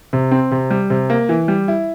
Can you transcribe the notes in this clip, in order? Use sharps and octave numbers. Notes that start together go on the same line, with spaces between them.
C3
C4
C3
G3
C3
A#3
E3
G3
E4